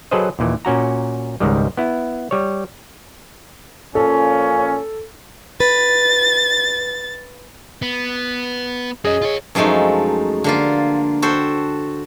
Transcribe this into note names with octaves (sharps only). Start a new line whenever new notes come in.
F#3 G#4 A4 B4 C5 D#5
D#2 A#2 E3
A#2 C#4 F#4 A#5
C#2 G#2 D#3 G3
B3 E4
G3 C#5
A#2 F3 C#4 A4
B4 A6
B3
C#4 F#4 G#4 D#5
F4 C#5
F#2 F3 G#3 A3 D#4
D3 A#3 F4
F#4 A4 C5 G5